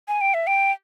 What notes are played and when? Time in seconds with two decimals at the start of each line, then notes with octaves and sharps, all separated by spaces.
0.08 G#5
0.21 G5
0.34 E5
0.47 G5